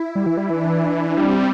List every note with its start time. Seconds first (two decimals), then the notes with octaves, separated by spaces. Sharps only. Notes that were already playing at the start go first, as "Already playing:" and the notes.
Already playing: E4
0.15 G3
0.26 E3
0.37 G3
0.50 E3 D4
1.17 G3 C4